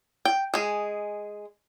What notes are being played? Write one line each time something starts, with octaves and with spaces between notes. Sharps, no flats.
G5
G#3 G#4